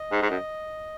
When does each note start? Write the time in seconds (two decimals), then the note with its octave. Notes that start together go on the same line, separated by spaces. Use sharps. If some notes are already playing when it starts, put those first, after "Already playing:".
Already playing: D#5
0.12 G#2
0.22 G#2
0.30 F#2